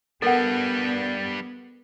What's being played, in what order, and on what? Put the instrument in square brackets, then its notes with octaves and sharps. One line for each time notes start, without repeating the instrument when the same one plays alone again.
[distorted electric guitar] G3 D4 [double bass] B3 [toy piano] A4 A#4 F#5